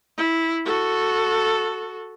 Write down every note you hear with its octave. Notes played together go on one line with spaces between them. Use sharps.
E4
F#4 A4